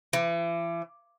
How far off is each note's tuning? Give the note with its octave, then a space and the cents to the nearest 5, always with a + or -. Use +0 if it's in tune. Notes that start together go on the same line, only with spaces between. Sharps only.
E3 +40